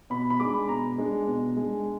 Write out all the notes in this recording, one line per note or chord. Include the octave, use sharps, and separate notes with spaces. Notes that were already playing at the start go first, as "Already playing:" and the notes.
B2 B5
B5
G#3 D4 D6
B5
B2 A#5
G#3 D4
B2
G#3 D4